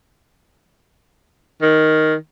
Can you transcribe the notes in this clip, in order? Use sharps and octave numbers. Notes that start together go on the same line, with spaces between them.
D#3